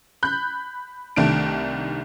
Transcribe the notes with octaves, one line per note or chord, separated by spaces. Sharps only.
B5 F#6 G6
C2 D#3 A3 D4 D7